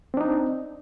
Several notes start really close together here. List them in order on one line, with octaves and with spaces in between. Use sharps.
C4 D4 D#4